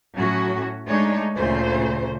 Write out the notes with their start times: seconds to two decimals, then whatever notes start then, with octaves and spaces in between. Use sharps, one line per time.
0.16 A2 F#3 C#4 F#4
0.85 G#3 A3 D4 D#4 C#5
1.35 D2 A#2 C#3 A3 C5